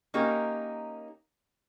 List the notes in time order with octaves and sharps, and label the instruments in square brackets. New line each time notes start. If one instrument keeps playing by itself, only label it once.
[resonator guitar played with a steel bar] A#3 C#4 D#4 G4 A#4